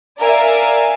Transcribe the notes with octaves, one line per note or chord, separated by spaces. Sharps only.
A#4 D5 E5 F5 G#5